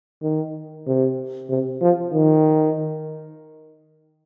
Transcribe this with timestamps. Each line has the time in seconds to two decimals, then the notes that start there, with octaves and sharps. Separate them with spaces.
0.22 D#3
0.87 C3
1.49 C3
1.81 F3
2.13 D#3